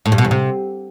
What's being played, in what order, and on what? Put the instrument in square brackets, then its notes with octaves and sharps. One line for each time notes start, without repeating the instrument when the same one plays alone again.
[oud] A2
G2
B2
E2
C3